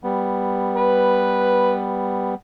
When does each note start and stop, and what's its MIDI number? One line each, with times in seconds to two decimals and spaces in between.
0.04 2.34 55
0.04 2.34 59
0.76 1.85 71